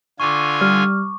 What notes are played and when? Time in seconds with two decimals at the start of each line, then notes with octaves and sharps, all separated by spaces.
0.20 D3 F4 G#5 C#6 D6
0.61 G3 F6